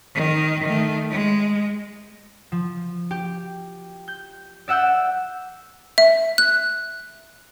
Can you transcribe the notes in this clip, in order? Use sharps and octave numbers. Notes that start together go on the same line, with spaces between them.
D#3
D#3 A3
G#3
F3
G4
G6
D5 E5 F#5 E6 G6
E5
F#6